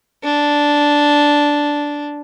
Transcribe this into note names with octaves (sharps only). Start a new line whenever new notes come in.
D4